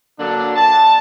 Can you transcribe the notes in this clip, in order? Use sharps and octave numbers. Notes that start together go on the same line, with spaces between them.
D3 F#3 A#3 D4
A5